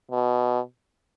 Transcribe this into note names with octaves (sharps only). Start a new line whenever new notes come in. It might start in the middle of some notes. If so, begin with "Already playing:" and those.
B2